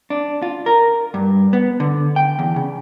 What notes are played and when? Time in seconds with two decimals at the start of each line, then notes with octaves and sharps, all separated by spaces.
0.10 D4
0.42 F4
0.66 A#4
1.14 G2
1.53 B3
1.80 D3
2.16 G5
2.39 E2
2.56 C#3